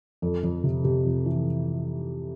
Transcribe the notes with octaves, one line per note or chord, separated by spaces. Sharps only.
F2 A4
F2
C3
C3 G4
F2
E3